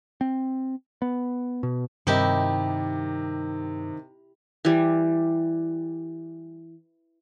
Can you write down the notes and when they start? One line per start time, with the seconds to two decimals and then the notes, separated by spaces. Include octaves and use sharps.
0.21 C4
1.02 B3
1.63 B2
2.07 G2 C3 D#3 E4 G4 D#5
4.65 E3 G3